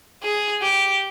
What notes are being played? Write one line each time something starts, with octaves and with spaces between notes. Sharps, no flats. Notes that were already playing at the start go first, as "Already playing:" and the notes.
G#4
G4